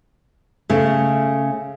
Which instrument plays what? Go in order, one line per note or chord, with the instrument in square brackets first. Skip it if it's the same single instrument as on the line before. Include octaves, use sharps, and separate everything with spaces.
[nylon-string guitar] C#3 A3